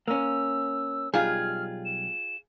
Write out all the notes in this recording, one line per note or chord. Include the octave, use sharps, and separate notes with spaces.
A#3 C#4 E6
B1 G3 F4 G#4 F6
E7